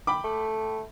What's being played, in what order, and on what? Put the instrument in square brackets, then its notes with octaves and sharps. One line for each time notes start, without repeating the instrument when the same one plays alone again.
[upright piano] G5 B5 D6
[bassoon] A3